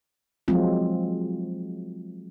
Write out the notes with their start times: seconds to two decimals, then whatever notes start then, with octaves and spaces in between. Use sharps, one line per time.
0.48 F3 F#3 G#3 C4 F4